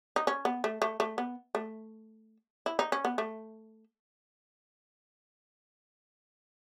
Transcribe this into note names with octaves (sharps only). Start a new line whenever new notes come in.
D#4
C#4
B3
A3
A3
A3
B3
A3
E4
D#4
C#4
B3
A3